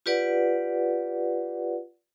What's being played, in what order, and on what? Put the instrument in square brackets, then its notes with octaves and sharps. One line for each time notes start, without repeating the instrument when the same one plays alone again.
[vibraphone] F4 G4 B4 D5 F#5